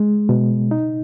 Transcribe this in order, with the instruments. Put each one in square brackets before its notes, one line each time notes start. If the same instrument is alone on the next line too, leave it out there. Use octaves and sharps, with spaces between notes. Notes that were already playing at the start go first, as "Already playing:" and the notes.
Already playing: [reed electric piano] G#3
B2
D#4